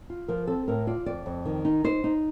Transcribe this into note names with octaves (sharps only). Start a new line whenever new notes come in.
F4
F3 A#4
C4 A4
A2 A#4
F4 D5
F2 D5
F2
D#3
D#4
D#4 C5
D#4